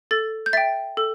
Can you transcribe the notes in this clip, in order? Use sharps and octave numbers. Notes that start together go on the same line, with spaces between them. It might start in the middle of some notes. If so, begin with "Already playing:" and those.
A4 A6
G6
E5 G5 A6
A4